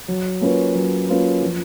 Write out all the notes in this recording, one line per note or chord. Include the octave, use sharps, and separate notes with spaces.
F#3
A#3 C#4 F4 B4
F#3
A#3 C#4 F4 B4
F3